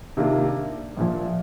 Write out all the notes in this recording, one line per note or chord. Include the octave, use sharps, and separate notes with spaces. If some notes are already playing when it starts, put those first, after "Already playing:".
C3 D#3 A#3 D4 F4
A#1 A#2 F3